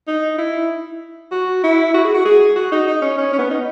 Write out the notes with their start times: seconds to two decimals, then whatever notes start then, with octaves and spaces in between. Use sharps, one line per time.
0.08 D#4
0.39 E4
1.32 F#4
1.64 E4
1.94 F#4
2.05 G#4
2.14 F#4
2.26 G#4
2.56 F#4
2.72 D#4
2.88 D#4
3.02 C#4
3.18 C#4
3.33 C#4
3.39 B3
3.51 D#4